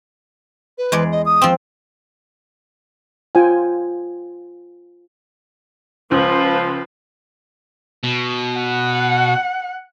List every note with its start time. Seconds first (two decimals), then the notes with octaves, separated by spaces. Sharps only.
0.78 B4
0.92 E2 G#3 D5
1.12 D#5
1.25 D#6
1.42 F3 C4
3.35 F4 C5 G5 G#5
6.11 C#2 F3 B4
8.03 B2
8.57 F#5